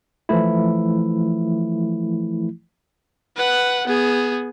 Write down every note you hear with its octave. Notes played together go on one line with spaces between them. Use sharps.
E3 F3 A3 E4
B4 F#5
B3 G#4